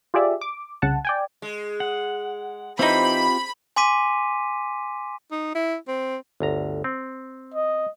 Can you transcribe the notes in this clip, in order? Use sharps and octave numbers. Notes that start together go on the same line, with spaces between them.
F4 G4 G#4 D5 E5
D6
C2 C#3 F#5 A5
D5 G5 G#5
G#3
F#5
E3 C4 D#4 F4 G4 C5 B5
G#5 C6 D6 B6 D#7
D#4
E4
C4
G1 D2 A#5
C4
D#5